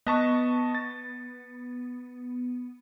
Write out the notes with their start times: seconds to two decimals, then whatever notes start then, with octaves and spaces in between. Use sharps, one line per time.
0.07 B3 D#5 A5 C#6
0.75 A6